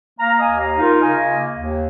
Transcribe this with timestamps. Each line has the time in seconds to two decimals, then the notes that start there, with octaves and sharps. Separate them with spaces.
0.19 A#3 F5 A#5
0.39 D#5 G#5
0.46 D#2
0.60 F5 A#5
0.74 D#4
0.80 F4 A#4
1.00 C#3 D#5 G#5
1.28 A#3
1.56 D#2